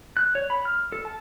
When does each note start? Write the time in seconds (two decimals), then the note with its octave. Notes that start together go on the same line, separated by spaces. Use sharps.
0.17 F#6
0.35 C#5
0.50 B5
0.65 F6
0.92 A4
1.05 A5